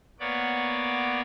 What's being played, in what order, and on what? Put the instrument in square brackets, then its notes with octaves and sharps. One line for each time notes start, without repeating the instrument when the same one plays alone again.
[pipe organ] A#3 B3 C#5 D5 F#5 D6